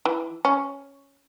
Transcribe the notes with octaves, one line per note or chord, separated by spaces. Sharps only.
E3
C#4